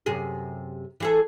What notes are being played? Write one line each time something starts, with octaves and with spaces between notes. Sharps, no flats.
F#2 C3 G#4
E3 G#4 A4